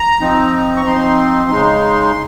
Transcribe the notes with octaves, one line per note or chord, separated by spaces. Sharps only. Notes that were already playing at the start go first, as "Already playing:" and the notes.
Already playing: A#5
F3 C4 D#4
C#6
F3 C4 D#4 C6
C#3 G#3 D#4